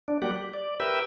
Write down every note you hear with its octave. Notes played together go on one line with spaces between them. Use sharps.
D4
F#3 G3 A#3 G4 D5 F#5
G4
D5
G4 A#4 B4 E5 G5 E6